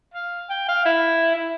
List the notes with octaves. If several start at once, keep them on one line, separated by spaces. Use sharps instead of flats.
F5
G5
F5
E4
E4